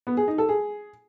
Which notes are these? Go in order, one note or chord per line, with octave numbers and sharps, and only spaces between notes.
B3
G#4
D#4
A4
G#4